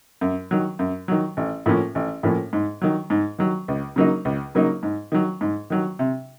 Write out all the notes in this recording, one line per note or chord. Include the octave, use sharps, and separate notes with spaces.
F#2
D#3 F#3
F#2
D#3 F#3
A1
A2 F3 A#3 C#4
A1
A2 F3 A#3 C#4
G#2
D#3 F#3
G#2
D#3 F#3
C#2
C#3 F#3 A#3 D#4
C#2
C#3 F#3 A#3 D#4
G#2
D#3 F#3
G#2
D#3 F#3
C3